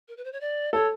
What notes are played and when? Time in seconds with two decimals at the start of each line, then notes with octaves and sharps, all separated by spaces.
0.08 A#4
0.17 B4
0.24 C5
0.32 C#5
0.40 D5
0.73 A4 C#5